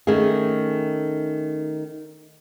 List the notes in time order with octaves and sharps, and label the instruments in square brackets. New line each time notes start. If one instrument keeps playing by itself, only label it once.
[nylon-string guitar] D#3 A3 C#4 G#4